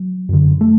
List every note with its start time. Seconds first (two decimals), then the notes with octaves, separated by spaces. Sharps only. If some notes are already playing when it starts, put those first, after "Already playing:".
Already playing: F#3
0.29 F#2 D3
0.61 A3